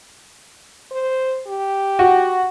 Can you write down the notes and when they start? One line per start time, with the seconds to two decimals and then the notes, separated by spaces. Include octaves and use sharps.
0.92 C5
1.47 G4
1.99 F#4